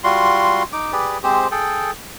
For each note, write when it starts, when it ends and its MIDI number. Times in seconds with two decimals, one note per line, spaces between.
0.04 0.63 55
0.04 0.63 65
0.04 0.63 66
0.04 0.63 84
0.73 0.92 63
0.73 0.92 86
0.92 1.18 67
0.92 1.18 68
0.92 1.18 71
0.92 1.18 74
1.23 1.48 56
1.23 1.48 60
1.23 1.48 67
1.23 1.48 72
1.51 1.91 68
1.51 1.91 69
1.51 1.91 79